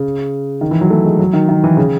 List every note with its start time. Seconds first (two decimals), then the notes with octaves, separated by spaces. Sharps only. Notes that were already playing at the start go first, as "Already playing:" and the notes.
Already playing: C#3
0.61 D#3
0.71 E3
0.81 F#3
0.90 A3
1.05 G#3
1.19 F#3
1.33 D#3
1.49 D#3
1.64 E3
1.77 C#3